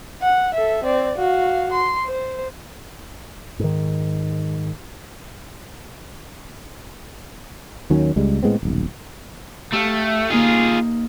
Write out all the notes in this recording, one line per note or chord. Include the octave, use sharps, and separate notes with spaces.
F#5
A4 E5
C4 D5
F#4 F5
C6
C5
G#2 D#3
D#2 D#3 F#3 C#4
C#2 G3 G#3
A2 G#3 B3 C4
D#1 B1
A3 G4 F5
A#3 D#4 F4 G#4